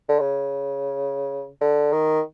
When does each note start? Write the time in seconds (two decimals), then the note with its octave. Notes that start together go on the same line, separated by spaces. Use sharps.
0.08 D3
0.19 C#3
1.61 D3
1.92 D#3